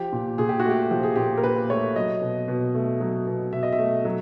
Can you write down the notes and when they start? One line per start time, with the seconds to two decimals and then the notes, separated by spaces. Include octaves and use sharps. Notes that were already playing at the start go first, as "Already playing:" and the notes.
Already playing: F3 G4
0.12 A#2
0.38 A#2 G#4
0.49 G4
0.59 F#4
0.65 A3
0.70 G4
0.91 F3 G4
1.03 G#4
1.16 A#2 G4
1.37 A#4
1.43 A#2 B4
1.70 A3 C#5
1.96 F#3 D#5
2.22 B2
2.48 B2
2.75 A3
3.00 F#3
3.27 B2
3.52 B2 E5
3.63 D#5
3.72 E5
3.79 A3
4.05 F#3